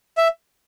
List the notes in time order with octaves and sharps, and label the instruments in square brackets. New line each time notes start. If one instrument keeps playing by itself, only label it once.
[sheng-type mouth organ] E5